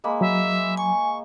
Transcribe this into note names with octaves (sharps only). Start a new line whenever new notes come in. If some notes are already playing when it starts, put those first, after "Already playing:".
G#3 A#3 B5
F#3 E5
G#5 C#6